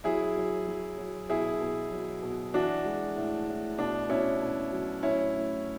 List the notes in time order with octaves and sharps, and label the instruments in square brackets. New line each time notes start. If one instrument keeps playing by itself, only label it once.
[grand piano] F#3 E4 G#4
F#3
F#3
F#3
B2 E4 G#4
B2
F#3
B2
E3 D4 F#4
G#3
A2
A2
B2 D4
B2 C#4 E4
B2
F#3
A2 C#4 E4
A2